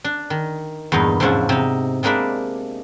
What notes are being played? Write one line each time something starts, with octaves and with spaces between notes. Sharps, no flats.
D4
D#3
E2 G2 A#2 D#4
E2 G#2 C3 F3 C#4 D4
C3 D#4
C3 G#3 A#3 D4 B5